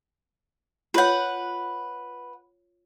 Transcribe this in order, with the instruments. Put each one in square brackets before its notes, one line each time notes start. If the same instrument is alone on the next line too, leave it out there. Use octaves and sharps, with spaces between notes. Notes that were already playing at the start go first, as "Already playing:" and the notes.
[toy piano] F4 C#5 [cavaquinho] B4 F#5